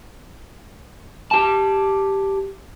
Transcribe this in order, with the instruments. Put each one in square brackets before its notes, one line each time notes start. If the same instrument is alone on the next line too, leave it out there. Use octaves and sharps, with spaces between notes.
[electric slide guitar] G4 A5